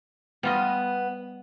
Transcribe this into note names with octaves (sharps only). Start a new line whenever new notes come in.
G3 B3 F4 D#5